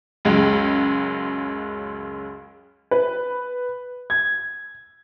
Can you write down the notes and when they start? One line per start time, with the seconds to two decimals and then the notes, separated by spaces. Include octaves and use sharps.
0.25 C#2 F#2 G#3
2.91 B4
4.10 G#6